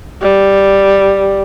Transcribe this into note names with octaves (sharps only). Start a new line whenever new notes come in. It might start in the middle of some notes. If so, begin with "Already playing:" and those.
G3